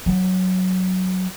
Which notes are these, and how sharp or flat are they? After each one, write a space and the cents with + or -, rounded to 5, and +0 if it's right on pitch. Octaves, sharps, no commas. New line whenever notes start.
F#3 +0